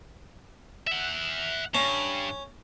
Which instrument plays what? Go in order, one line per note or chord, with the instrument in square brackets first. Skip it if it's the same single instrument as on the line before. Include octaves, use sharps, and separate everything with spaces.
[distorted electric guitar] E5 F#5
[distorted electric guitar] G2 [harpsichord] C#4